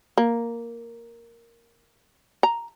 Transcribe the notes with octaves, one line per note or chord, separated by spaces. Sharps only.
A#3
A#5